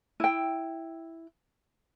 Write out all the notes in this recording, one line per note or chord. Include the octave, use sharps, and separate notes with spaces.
E4 G5